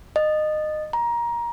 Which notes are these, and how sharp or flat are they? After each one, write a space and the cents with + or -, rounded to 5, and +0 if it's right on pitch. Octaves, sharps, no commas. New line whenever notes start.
D#5 -20
A#5 +20